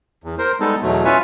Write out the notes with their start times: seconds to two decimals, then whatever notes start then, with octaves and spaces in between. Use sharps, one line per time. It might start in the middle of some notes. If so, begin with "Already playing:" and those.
0.24 E2
0.39 A#4 C5
0.60 G3 G#3 B3 D#4 A4
0.82 E2 B2 F#3 A3
1.05 C#4 F4 B4 C#5 E5 G#5